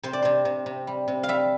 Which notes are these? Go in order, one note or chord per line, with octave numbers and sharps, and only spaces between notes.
C3 C5
D5
C3 C5
C3
C3
G3
C3
F5
G3 E5